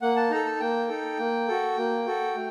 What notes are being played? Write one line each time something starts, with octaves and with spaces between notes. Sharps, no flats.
A#3 F#5
A5
D#4 A4 A#5
A5
A#3 G5
D#4 A4
A#3
F#4 A4
A#3
F#4 A4
A3